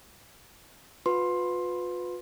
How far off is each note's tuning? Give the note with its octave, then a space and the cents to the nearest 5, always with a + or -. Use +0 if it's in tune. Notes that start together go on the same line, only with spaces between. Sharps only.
F4 +40 B4 +10 C6 +15